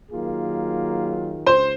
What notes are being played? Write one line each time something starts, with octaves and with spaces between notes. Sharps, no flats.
D#3 F#3 A#3 F4 G#4
C#2 C5 C6